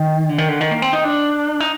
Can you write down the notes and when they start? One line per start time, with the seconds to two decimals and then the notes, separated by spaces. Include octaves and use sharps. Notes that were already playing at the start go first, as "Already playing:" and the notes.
Already playing: D#3
0.29 D3
0.38 D#3
0.49 D3
0.61 D#3
0.71 A#3
0.82 C4
0.93 D#4
1.04 D4
1.60 D#4